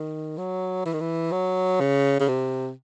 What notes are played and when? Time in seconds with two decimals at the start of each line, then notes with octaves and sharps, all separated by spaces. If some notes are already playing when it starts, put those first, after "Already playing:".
Already playing: D#3
0.37 F#3
0.86 E3
0.93 D#3
1.00 E3
1.32 F#3
1.80 C#3
2.20 C#3
2.28 C3